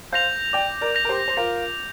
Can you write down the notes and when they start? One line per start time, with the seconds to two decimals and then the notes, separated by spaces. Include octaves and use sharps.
0.12 C5 F5 G6 A#6 F7
0.53 D5 G5 D6
0.81 A#4 D5
0.95 G6 A#6 F7
1.05 A#4
1.09 G4 C5
1.28 C5
1.37 F4 A#4 A#6